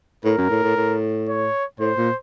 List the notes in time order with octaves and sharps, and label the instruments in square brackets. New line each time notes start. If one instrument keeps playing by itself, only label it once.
[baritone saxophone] A2 [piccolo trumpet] A#4
[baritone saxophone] F#2
A2
A2
A2
[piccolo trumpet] C#5
[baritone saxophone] A2 [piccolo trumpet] C5
[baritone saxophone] A#2